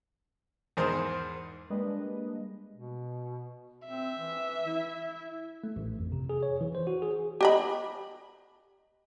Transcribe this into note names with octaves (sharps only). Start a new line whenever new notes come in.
E2 G#2 G#4 A#4 C5
G3 G#3 A#3 D4 B4 D#5
B2
C4 E5
E3
E4
A3
A1
F2
C3
G#4
C#5
E3
C5
F#4
G#4
G4 D#5 B5